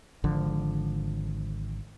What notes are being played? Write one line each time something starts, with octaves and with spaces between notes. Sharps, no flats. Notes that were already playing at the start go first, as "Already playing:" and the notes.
G#1 D3 F3